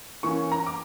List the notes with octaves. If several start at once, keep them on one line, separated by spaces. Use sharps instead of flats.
E3 A#3 C#4 C#6
A#5
D6